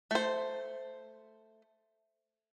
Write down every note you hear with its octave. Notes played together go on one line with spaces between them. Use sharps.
A3 C5